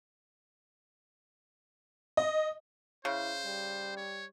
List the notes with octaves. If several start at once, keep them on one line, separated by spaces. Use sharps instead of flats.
D#5
C#3 E4 C5
G3
C#5